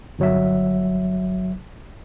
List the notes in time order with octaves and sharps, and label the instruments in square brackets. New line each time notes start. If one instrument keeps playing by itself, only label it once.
[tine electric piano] G1 F#3 E5